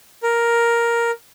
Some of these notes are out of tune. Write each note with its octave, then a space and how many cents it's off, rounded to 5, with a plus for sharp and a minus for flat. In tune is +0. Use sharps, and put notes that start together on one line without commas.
A#4 +5